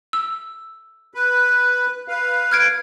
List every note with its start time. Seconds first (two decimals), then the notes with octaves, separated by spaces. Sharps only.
0.13 E6
1.14 B4
2.08 B4 F5
2.52 F6 G#6 D7